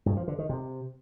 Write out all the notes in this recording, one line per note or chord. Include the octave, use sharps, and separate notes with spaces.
G2
F3
D3
D#3
C3